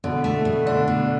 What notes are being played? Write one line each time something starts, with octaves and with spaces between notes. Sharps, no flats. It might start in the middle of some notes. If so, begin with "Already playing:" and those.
B2 D3
A3
B2
D3 D4
B2